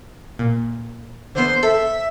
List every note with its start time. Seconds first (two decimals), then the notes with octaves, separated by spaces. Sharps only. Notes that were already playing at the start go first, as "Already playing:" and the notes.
0.39 A#2
1.35 D3 E3 B3 C5
1.63 A4 E5